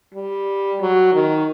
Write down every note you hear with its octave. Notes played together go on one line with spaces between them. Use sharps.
G3
F#3
D#3